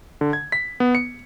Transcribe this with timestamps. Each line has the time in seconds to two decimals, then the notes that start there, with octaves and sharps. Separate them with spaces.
0.21 D3
0.33 G#6
0.52 B6
0.80 B3
0.95 C#7